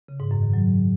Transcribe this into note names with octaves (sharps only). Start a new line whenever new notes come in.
C#3
G#2
F#2
D#3
F#3